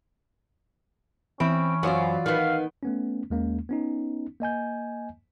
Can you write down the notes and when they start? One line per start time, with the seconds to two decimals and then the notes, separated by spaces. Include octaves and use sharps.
1.40 E3 C4 C#4 B5 D7
1.83 F#2 F#3 F4 C5 D5
2.26 D#3 B3 F5
2.83 A3 B3 C#4
3.30 D#2 G#3 A#3 C#4
3.69 B3 C#4 D#4
4.40 A#3 D#5 G#5 G6